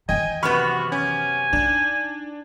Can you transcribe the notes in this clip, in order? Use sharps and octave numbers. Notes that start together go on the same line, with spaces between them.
D#3 E3 D#5 G5 G#5
F#2 C3 B3 F#4 B5 C#6 F6
C#4 G#5
D4 D#4